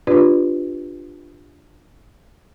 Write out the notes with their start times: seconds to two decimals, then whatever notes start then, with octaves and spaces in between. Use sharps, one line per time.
0.07 D4 F4 G4 B4 D5